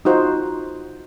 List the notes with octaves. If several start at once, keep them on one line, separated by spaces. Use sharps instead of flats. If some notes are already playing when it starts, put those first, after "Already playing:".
D#4 F4 F#4 C5